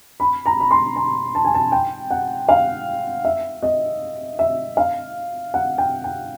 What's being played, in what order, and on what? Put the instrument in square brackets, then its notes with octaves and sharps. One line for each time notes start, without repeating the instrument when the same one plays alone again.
[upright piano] B5
A#5
B5
C6
A#5
A5
G#5
A5
G5
F#5
F5
E5
D#5
E5
F5
F#5
G5
G5